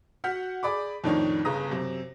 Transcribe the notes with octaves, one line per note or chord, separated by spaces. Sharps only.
F#4 F#5 F6 G6 B6
G#4 D5 B5 D6
F2 A2 D#3 D4 D#4 C#5
G1 C#3 B4 A#5 D#6 A#6
F#2 C3